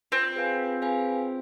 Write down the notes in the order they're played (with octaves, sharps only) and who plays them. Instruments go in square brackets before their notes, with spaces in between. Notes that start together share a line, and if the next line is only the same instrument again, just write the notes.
[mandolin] C4 [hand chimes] F4
[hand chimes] G#4 B4 F5 G#5
F4
G#4 B4 F5 G#5
F4